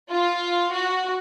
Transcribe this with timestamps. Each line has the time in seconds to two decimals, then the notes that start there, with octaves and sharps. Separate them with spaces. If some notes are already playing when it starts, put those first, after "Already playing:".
0.11 F4
0.73 F#4